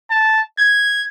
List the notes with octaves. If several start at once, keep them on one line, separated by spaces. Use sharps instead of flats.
A5
G#6